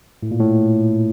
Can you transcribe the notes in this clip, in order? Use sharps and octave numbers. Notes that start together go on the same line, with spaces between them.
A2
A#2
A2